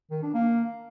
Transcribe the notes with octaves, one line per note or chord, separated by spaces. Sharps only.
D#3
D4
A#3